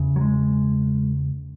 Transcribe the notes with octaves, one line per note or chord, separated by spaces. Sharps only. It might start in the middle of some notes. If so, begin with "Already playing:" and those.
Already playing: E2 C#3
F#3
G#3